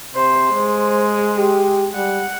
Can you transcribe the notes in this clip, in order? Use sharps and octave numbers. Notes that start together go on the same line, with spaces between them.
C3 C5
G#3 C5
G4
G3 F#5